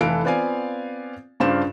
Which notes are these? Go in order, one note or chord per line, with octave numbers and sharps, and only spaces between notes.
F1 E3 A4 B4 F5 D7
B3 C4 F4 D5 F5 G#5
G2 C#3 D4 F4 C5 E7